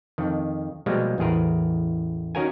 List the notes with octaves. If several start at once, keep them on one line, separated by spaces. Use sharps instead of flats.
F2 D#3
B2 F3 G3 G#3 A#3
A1 E2 G#4 A#4 B4
D#3 C#4 F#4 A#4 F5 G#5